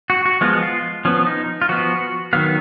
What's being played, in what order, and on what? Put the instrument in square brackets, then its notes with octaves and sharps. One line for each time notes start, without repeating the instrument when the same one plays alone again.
[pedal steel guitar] F#4
F#4
F3 G#3 B3 F4
F4
F3 B3 C#4
D#4
F4
F3 B3 F#4
D#3 F#3 B3 F5